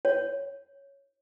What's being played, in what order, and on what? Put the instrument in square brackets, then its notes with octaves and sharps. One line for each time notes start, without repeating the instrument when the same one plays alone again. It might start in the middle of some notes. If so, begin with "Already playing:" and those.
[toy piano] C#5